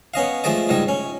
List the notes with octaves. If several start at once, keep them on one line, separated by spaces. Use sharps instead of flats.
B3 C#4 D#5 F5
F3 G#3 A3 D5 D#5
C#2 G#2 G3 D#5
C#4